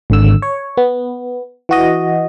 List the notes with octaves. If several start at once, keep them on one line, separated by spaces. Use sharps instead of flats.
G#1 D3 E6
C#5
B3
E3 F#4 D#5